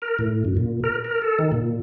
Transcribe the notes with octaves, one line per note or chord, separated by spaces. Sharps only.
A#4
A2
F#2
A#2
A#4
A#4
A4
D#3
A#2